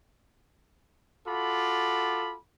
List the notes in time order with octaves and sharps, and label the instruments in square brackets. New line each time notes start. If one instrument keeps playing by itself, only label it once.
[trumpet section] F4 F#4 A4 B5 D6